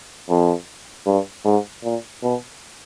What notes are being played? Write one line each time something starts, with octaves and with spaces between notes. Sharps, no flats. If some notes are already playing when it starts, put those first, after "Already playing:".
F2
G2
G#2
A#2
B2